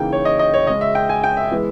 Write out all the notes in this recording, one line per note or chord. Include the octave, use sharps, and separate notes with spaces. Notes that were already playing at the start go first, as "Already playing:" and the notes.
Already playing: C#3 E3 A#3 D#4 G5
C#5
D#5
D#5
C#5
C#3 G#3 C#4 D#5
E5
G5
G#5
G5
E5
E3 G#3 B3